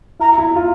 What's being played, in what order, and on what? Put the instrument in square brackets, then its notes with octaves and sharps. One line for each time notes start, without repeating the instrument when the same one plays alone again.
[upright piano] E4 [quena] A#5
[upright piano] E4
F4